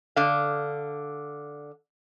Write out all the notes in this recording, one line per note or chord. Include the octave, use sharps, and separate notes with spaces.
D3 F5